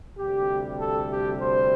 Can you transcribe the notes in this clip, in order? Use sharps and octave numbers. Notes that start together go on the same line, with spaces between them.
D2 C3 G3 G4
A4
G4
C5